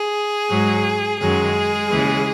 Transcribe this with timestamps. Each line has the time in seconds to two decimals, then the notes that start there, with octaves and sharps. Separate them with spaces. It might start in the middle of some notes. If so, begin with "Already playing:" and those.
Already playing: G#4
0.49 G#2 F#3
1.19 F#2 D#3 F#3 G#3 G#4
1.91 D#2 C#3 E3